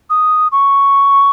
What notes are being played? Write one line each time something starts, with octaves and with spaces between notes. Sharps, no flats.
D#6
C#6